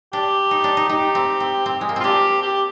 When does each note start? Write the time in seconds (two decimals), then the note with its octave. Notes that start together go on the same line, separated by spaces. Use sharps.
0.13 D4 G4
0.51 D#4
0.64 D4
0.77 D#4
0.89 D#4 G4
1.15 C4
1.40 C4
1.66 C4
1.81 G#3
1.89 A#3
1.96 C4 F4
2.04 D4 G4
2.42 G4